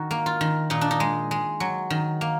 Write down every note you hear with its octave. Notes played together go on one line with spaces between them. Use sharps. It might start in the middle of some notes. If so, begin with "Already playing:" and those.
Already playing: D#3 D#4 F#4
A#3
F4
D#3
A#2 D#4
D4
D#4
G#3
G#3
F#3
D#3
A#3